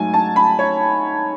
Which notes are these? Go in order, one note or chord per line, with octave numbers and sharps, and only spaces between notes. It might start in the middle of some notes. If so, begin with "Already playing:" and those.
Already playing: G#2 F#3 A3 G#5
A5
B5
C#5